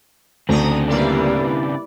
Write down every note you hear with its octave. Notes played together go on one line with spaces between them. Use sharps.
D2 C#3 C4 D4 A#5 D#6
G3 A#3 E4 B4 D5